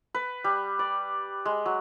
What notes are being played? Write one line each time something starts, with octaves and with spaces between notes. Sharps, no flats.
B4
G3
D5
G#3
F#3